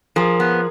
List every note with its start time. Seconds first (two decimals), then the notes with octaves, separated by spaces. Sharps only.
0.16 F3 G#4 A#4
0.40 B3